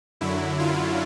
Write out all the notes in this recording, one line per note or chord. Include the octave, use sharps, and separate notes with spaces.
F#2 D3 F#3 E4
F4